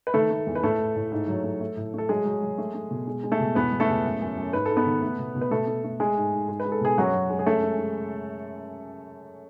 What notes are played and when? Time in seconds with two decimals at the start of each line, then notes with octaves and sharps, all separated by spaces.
0.07 B4
0.14 D#3 A3 A4
0.31 A3
0.47 E2
0.55 B4
0.63 A2 A3 A4
0.79 A2
0.96 A2
1.12 G#2
1.28 F#3
1.44 A3
1.61 A3
1.77 A2
1.94 A3 A4
2.09 F#3 G#3 G#4
2.25 F#3
2.42 F#3
2.58 A3
2.75 A3
2.91 B2
3.07 G#3
3.24 G#3
3.32 A3 A4
3.40 B2
3.55 E2 B3 B4
3.72 E2
3.80 A3 A4
3.89 E2
4.05 F#2
4.21 F#2
4.37 F#2
4.53 G#2 B4
4.66 G#2 A4
4.77 B3 B4
4.86 D#3
5.02 A3
5.19 B2
5.35 B2
5.41 B4
5.51 B2 A3 A4
5.68 A3
5.84 A3
6.00 G#3 G#4
6.17 G#2
6.33 G#2
6.49 G#3
6.60 B4
6.65 G#3
6.72 A4
6.81 B2 G#4
6.98 F#2 F#3 F#4
7.14 F#2
7.30 G#3
7.39 G#4
7.46 F#2 A3 A4
7.63 G#3
7.79 G#3